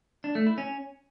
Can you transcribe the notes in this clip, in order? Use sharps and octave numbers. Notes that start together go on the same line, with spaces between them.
D4
A3
E4
C#4